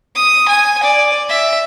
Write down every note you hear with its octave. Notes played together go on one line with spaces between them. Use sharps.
D#6
G#5
D5
E5